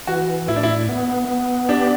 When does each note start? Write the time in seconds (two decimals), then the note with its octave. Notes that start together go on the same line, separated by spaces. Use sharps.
0.07 E3 F#4
0.48 A2 E4
0.56 D4
0.63 E4
0.89 B3
1.29 B3
1.69 D4 G4